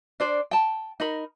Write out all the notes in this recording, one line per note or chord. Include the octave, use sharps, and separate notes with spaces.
D4 C5 D5
G5 A5
D#4 A#4 B5